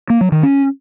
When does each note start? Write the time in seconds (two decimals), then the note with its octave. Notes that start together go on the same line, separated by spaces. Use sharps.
0.10 A#3
0.21 F#3
0.32 D#3
0.43 C#4